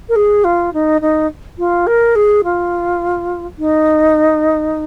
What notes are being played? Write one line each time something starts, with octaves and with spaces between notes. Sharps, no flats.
A#4
G#4
F4
D#4
D#4
F4
A#4
G#4
F4
D#4